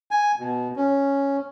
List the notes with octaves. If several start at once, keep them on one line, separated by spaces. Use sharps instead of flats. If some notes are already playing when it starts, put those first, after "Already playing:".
G#5
B2
C#4